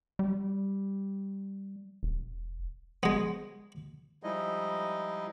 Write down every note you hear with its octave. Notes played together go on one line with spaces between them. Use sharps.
G3
E1
G#3 B3
F3 G3 G#3 D#4 E4 D#5